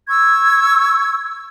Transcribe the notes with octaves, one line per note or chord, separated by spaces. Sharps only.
C#6 E6 G#6